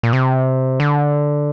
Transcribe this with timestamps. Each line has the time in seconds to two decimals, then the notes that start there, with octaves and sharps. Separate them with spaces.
0.03 A#2
0.13 C3
0.80 D3